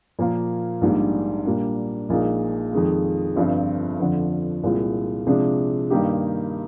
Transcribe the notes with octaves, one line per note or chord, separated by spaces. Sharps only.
A#2 F3 A#3 F4
A#1 G#2 G3 A#3 D4
A#2 G3 A#3 D4
A#1 A#2 G#3 D#4
F2 D#3 G#3
G1 G2 F3 C4 F4
F2 D3 F3
C2 A#2 G#3 C4 F4
C3 F3 G#3 D4
G2 D#3 A#3 D#4 G4